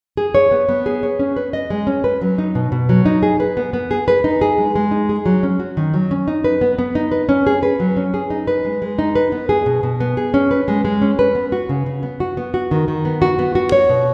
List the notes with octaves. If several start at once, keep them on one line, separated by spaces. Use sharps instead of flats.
G#4
C#5
B3
B3
G#4
C#5
C#4
B4
D#5
G#3
C#4
B4
F#3
D#4
B2
B2
F#3
D#4
G#4
B4
B3
B3
G#4
B4
D#4
G#4
G#3
G#3
D#4
G#4
F#3
C#4
F#4
D#3
F#3
C#4
D#4
B4
B3
B3
D#4
B4
C#4
G#4
B4
F#3
C#4
G#4
D#4
B4
G#3
G#3
D#4
B4
B3
G#4
B2
B2
B3
G#4
C#4
B4
G#3
G#3
C#4
B4
B3
F#4
C#3
C#3
B3
F#4
B3
F#4
D#3
D#3
B3
F#4
B3
F#4
C#5
B2